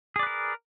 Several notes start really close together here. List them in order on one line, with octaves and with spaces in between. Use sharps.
G#4 D5 B4 A#4